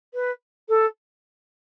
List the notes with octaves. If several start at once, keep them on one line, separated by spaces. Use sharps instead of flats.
B4
A4